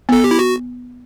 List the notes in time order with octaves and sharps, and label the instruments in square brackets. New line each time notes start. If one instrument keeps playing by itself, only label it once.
[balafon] B3
[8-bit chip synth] A4
G4
E4
F#4